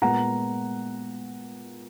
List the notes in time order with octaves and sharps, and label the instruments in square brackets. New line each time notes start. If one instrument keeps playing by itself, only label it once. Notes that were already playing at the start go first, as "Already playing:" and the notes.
[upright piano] A#2 G#3 B3 F#5 A#5